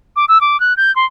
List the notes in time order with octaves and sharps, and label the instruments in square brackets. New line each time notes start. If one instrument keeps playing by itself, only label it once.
[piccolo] D6
E6
D6
F#6
G6
C6